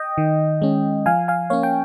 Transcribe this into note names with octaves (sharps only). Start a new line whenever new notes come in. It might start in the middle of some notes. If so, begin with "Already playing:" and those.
Already playing: D#5 G5
D#3
G#3 C#4
F3 F5 G#5
F5 G#5
A#3 C#4 C#5 F5
G5